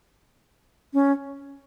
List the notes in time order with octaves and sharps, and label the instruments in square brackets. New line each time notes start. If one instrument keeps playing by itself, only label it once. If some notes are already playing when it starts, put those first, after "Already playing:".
[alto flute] C#4